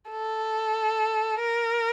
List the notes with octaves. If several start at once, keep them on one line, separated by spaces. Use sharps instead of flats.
A4
A#4